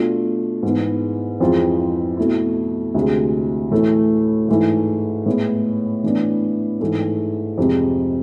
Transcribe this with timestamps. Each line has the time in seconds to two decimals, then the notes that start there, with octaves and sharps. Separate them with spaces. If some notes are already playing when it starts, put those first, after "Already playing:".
Already playing: B2 A3 D4 F4
0.63 G#2 E3 B3
1.40 F2 E3 G#3 C4 F4
2.17 B2 A3 E4
2.94 D2 C3 G#3
3.71 A2 E3 A3 E4
4.49 G#2 E3 A3 E4
5.26 A2 G#3 B3
6.04 A2 E3 B3 D4
6.80 G#2 E3 A3
7.58 F2 C3 G#3